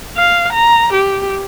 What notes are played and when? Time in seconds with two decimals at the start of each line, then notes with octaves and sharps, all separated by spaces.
0.17 F5
0.53 A#5
0.93 G4